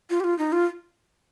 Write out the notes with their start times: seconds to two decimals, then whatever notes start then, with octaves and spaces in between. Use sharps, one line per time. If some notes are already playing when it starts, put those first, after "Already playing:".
0.10 F4
0.20 G4
0.24 F4
0.38 D#4
0.52 F4